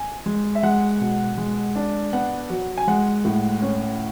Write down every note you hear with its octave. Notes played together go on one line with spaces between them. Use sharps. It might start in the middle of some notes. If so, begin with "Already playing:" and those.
Already playing: G#5
G#3
E5
G#3 F#5
B2
G#3
D4
B3 F#5
F#3
G#5
G#3 F#5
A2
C#4